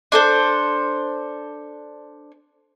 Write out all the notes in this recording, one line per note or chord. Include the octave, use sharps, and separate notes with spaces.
D4 A4 C5